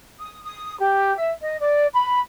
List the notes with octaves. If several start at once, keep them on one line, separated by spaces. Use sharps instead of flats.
D#6
D#6
G4
E5
D#5
D5
B5